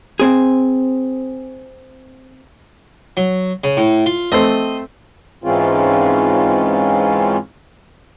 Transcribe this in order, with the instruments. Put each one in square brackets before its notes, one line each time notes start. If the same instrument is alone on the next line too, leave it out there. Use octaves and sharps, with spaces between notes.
[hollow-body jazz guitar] C4 G#4
[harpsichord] F#3
C#3
A2
F4
[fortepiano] A3 C4 C5 [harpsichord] D#5
[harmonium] G#2 E3 G#3 C4 C#4 F4